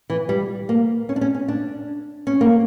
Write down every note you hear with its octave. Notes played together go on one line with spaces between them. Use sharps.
E3
G3
A#3
C#4
D4
C#4
C#4
D4
C#4
A#3